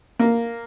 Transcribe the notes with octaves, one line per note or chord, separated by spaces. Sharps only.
A#3